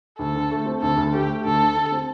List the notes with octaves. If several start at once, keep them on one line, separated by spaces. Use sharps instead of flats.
D2 A4
D3
A3
C4
D2 A4
D2
A3 G4
A3
D2 A4
D3
D3
C4